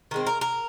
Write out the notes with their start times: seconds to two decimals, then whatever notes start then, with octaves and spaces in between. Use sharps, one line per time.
0.11 D#3 G#3 C4
0.27 A#4
0.41 A#4